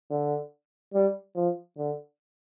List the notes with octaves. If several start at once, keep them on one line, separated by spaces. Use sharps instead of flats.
D3
G3
F3
D3